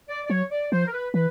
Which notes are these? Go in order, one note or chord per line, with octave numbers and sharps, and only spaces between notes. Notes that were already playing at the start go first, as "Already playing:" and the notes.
D5
D5
F#3 C#5
D5
F3 C5
A#4
B4
E3 B4